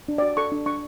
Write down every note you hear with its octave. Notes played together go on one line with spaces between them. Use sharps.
D4
D5
F#4
A4 C#6
D4
D4 C#6